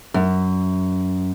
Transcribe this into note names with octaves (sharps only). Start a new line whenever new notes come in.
F#2